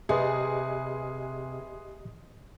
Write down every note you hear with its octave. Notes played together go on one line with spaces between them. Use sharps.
C3 G4 G#4 B4 D#5 E5 C6 D#6